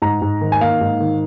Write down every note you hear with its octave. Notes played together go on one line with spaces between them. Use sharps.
G#2 A#5
G#2
D#3
G#5
A#3 F5
G#2
D#3